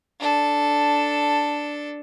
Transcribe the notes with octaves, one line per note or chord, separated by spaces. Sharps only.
D4 A4